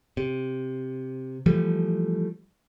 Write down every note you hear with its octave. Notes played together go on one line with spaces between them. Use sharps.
C3
E3 F3 G3 A3